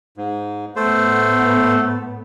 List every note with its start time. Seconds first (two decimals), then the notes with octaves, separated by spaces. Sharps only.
0.17 G#2
0.76 A2 A3 B3 C5